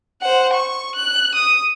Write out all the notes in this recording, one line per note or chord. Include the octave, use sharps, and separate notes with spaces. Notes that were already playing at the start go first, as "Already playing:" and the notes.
C5 F#5
C#6
F#6
D#6